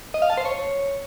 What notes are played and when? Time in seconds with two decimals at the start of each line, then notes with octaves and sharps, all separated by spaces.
0.14 D#5
0.22 F5
0.30 A5
0.37 C5
0.45 C#5